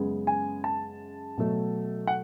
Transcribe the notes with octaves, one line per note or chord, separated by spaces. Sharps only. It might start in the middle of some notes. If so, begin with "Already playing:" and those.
Already playing: F#2 C#3 G#3 B3
G#5
A5
B2 F#3 A3
F#5